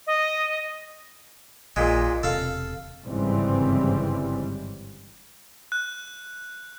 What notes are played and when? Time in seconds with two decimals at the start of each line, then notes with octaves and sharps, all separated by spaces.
0.07 D#5
1.76 A#1 A#2 G#3
2.23 E1 C3 A4 F5
3.04 G1 G#2 C#3 E3 G3 C4
5.72 F#6